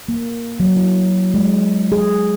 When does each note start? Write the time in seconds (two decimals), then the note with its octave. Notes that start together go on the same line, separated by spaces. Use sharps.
0.09 A#3
0.60 F#3
0.77 E4
1.34 G#3
1.92 G#4